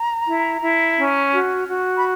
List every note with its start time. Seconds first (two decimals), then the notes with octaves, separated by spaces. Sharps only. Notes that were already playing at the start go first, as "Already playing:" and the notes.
Already playing: A#5
0.27 E4
0.62 E4
0.97 C#4
1.32 F#4
1.68 F#4
1.96 B5